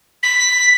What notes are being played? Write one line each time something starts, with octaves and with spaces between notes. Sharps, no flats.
B6